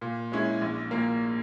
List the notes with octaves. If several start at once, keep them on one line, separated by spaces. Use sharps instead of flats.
A#2
G#3 C#4 E4
A#1
A#2 A#3